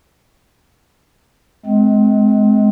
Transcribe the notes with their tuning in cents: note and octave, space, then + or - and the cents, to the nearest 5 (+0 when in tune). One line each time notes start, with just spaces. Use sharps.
G#3 +30 C4 -20